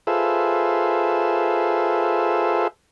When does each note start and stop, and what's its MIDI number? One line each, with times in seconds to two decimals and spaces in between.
0.07 2.68 65
0.07 2.68 68
0.07 2.68 69
0.07 2.68 71
0.07 2.68 72
0.07 2.68 76